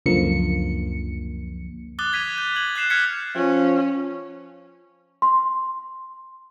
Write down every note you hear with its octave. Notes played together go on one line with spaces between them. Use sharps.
C#2 F#2 D3 F3 A#3 C#7
D6 D#6 F#6 A6 G7
G#6 B6 D#7 F7
G6
G#6 F#7
F#6 G6 C7 E7 F7
F6 F#6 G#6 B6 C#7
F3 C#4
C6